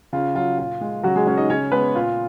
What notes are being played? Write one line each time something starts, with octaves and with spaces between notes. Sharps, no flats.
C#3 F4
F#3 F4
A#2 F4
G#3
C#3 F#3 F#4
G#3 G#4
G#3 C#4 C#5
D#4 D#5
C#3 C#4 C#5
G#3 B3 B4
A#2 F4